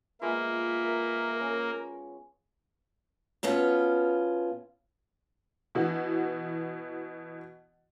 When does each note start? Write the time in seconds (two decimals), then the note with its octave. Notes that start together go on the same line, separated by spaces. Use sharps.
0.21 G#3 A#3 B3 F4 E5
0.82 A#4
1.41 C#4
3.43 B2 B3 C#4 F4
5.75 B2 E3 F#4